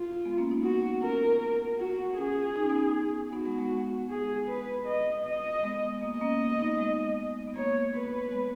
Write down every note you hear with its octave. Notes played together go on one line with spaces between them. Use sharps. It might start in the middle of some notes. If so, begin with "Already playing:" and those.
Already playing: F4
G#3 B3
A#3 C#4
B3 D#4
F#4
C#4 F4 A#4
F#4
C#4 F4 G#4
D#4
C#4
B3 D#4
B3 D#4 F#4
G#3 B3
G#3
G#3
G#4
B4
D#5
D#5
G#3 B3
A#3 D#5
A#3 C#4
B3 D#4
G#3
B3
A#3 C#5
B4
G#3 B3